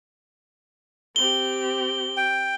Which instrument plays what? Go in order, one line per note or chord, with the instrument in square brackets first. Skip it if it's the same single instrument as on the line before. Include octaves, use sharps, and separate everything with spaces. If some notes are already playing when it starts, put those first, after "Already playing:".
[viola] C4 G4 [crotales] G7
[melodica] G5